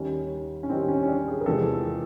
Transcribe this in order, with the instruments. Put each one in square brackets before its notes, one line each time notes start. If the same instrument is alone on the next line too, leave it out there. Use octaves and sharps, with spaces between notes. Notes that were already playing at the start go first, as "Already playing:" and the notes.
Already playing: [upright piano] D#2 D#3 G3 C#4
C#4
D#2 D#3 G3 C4
C#4
C#4
D4
G#4
A#4
E2 C3 F3 G#3 A4